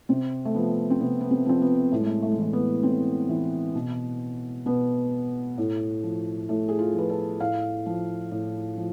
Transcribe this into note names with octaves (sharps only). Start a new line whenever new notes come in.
C3 C4
A3
F3 B3
C4
C3 B3
B3
C4
F3 C4
B3
A2 A3
G#3
A3
A3
G#3
E3 A3
B3
A2 C4
E3
B2
B2 B3
A2
F3
A2 A3
G#4
F4
F3 B4
A4
A2 F5
F3
A2
F3